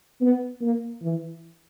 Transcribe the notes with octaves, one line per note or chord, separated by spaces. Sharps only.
B3
A#3
E3